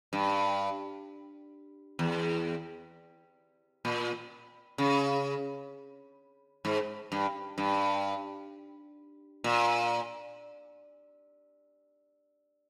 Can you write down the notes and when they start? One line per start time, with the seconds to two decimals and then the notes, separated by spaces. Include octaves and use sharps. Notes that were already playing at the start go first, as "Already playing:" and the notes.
0.13 G2
1.99 E2
3.85 A#2
4.78 C#3
6.65 G#2
7.12 G2
7.58 G2
9.44 A#2